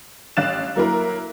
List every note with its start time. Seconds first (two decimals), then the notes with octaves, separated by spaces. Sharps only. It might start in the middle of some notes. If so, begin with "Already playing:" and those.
0.37 A1 F5 F#6 A6 E7
0.76 F#3 A#3 E4 A#4